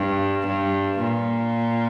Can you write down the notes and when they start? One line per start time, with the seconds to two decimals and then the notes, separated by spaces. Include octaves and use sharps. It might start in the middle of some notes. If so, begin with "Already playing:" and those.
Already playing: G2
0.47 G2
0.99 A#2